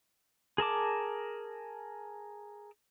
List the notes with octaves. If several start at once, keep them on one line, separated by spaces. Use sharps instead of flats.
G#4 A#4 A5 D6